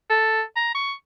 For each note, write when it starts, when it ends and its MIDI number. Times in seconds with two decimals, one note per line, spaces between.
0.10 0.42 69
0.56 0.75 82
0.75 0.93 85